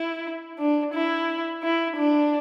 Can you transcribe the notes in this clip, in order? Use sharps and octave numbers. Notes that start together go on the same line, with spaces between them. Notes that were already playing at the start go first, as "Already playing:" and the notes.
Already playing: E4
D4
E4
E4
D4